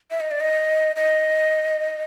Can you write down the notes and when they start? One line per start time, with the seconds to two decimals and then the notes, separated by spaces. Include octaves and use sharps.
0.11 E5
0.20 D#5
0.31 D5
0.40 D#5
0.96 D#5